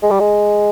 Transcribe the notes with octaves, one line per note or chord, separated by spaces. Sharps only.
G#3
G3
G#3